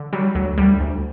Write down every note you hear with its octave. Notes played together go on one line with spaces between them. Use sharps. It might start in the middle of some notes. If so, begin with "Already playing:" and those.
Already playing: D3
F#3 G3
D2 F#3
D2 G3
D2